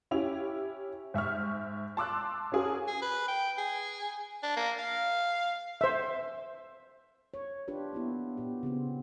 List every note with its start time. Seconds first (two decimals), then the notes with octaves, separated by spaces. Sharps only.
0.11 C#4 E4 G4 F7
1.14 G#2 E5 C#6 F6
1.97 A5 C6 D6 E6 F#6
2.52 C#4 F#4 G#4 A#4
2.87 G#4
3.02 B4
3.28 G5
3.58 G#4
4.43 D4
4.57 A#3
4.79 F5
5.81 C5 E5
7.34 C#5
7.68 D4 F4 G4 B4
7.93 A#3 B3 E4
8.37 A#2 B3 G4
8.63 C#3 B3 C4